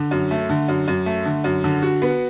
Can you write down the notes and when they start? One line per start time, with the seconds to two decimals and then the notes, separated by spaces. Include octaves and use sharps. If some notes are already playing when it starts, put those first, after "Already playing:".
Already playing: D3
0.11 F#2
0.31 A3
0.49 D3
0.68 F#2
0.88 F#2
1.06 A3
1.25 D3
1.44 F#2
1.64 D3
1.83 F#4
2.02 B3